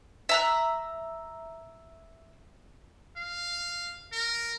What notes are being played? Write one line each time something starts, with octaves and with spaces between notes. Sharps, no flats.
E5 A#5 F#6
F5
A#4